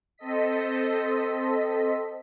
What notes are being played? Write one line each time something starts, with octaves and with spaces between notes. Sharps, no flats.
C4 A4 D#5 B6